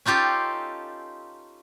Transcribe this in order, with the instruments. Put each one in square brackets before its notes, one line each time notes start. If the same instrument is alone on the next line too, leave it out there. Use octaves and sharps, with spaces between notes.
[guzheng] C#4 D#4 F4 G4 A4